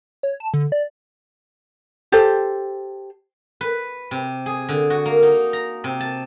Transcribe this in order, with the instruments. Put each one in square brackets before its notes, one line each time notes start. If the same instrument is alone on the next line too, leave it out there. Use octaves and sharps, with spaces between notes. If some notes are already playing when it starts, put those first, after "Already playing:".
[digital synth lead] C#5
A5
D3
D5
[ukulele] G4 A4 C5
[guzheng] B4
C3
G#4
D3
F#4
A#3
D#4
A#5
C3
A5